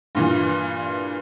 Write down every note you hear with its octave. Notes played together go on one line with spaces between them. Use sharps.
G2 A#2 E3